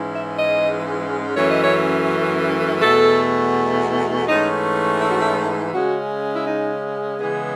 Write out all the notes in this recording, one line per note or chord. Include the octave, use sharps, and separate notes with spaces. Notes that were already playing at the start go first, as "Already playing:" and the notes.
Already playing: G#2 E3 G#3 C#4
E5
D#5
F#2 E3 A3 C#4 C#5
D#5
C#5
E2 B2 A3 A4
G#2 E3 A3 C#4 D#4
E4
F#4
E4
C#3 G#3 C#4 F#4
E4
D#4
C#3 E3 G#3 B3 G#4